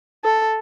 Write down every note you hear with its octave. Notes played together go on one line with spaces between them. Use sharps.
A4